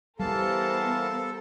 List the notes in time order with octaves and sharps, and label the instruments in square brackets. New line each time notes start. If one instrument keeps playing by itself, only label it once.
[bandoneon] E3 F5 A5 [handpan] G3 [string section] B3 A#4 C5 [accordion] A4